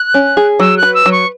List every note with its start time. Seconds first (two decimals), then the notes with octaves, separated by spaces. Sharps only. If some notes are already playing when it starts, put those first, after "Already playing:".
Already playing: F#6
0.14 C#4
0.37 G#4
0.60 F#3 E6
0.77 F#6
0.83 B4
0.94 E6
1.06 F#3
1.12 C#6